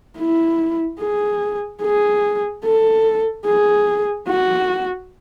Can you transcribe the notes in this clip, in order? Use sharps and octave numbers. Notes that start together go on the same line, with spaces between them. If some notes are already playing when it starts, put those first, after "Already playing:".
E4
G#4
G#4
A4
G#4
F#4